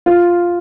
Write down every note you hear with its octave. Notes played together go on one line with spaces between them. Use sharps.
F4